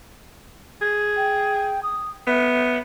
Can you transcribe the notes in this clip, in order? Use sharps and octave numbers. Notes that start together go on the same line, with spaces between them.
G#4
G5
D#6
B3 E5